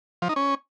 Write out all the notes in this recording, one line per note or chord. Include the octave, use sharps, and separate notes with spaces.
F3
D#4
C#4